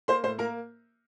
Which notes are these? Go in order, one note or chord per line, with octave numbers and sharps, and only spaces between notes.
A#3 C5 C6
A2 C5 C6
A#3 A#4 A#5